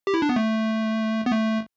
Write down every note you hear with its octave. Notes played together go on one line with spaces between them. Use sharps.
G4
E4
D4
B3
A3
B3
A3